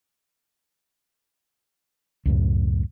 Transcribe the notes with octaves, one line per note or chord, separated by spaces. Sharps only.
C#2 F#2 A2